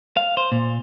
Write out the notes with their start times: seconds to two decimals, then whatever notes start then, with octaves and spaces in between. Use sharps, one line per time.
0.17 F5
0.37 C5
0.52 A#2